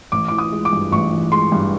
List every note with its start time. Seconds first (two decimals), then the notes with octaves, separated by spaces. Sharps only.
0.12 A1 D6
0.28 E3 D6
0.38 D#6
0.52 G#3
0.65 D6
0.73 G2
0.92 A1 C#6
1.12 E3
1.32 G#3 C6
1.52 G2